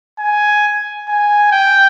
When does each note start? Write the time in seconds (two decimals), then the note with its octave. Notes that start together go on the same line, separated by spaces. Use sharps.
0.19 G#5
1.08 G#5
1.52 G5